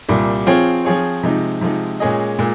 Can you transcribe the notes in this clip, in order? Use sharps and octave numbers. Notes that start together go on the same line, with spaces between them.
C2 A#2 G3
F3 C4 F4 G#4 C#5
F3 C4 F4 G#4 C#5
C3 F3 G#3 D#4
C3 F3 G#3 D#4
A#2 G#3 C#4 G#4 D#5
A#2 G#3